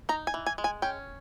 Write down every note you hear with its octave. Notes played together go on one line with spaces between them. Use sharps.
D#4 A#5
G#5
E3
G#5
G#3
G#5
C#4 G5